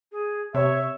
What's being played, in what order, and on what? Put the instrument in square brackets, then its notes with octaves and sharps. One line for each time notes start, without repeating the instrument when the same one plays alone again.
[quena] G#4
[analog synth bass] C3 [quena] C#5 [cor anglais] E5